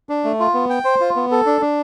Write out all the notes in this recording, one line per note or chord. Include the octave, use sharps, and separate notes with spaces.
D4
A3
F4
B3
G5
C5
F4
B3
A4
D4
D4